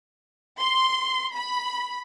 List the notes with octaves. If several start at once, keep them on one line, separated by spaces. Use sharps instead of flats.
C6
B5